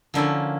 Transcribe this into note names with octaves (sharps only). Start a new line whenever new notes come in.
D3 F3 A#3 C#4 E4